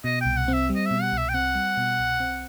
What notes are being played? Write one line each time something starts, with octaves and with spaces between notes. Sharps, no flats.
B2 D#5
C2 G5
F#5
C4
E5
G3
D#5
E5
B2
F#5
C2
E5
G5
C4 F#5
G3
B2
C2
C4